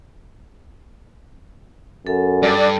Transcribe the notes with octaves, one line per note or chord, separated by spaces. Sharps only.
F#2 A4
G2 D5